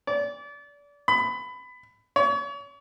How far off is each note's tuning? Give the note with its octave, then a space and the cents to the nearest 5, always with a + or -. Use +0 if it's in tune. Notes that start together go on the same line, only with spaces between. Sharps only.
D5 -30
B5 +20
C#5 +35